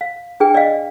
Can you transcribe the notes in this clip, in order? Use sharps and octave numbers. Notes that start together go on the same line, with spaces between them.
F5
D4 G#4 B4 G5
D5 D#5 F5